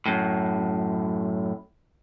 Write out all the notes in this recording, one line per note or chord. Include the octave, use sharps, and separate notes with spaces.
F#2 A2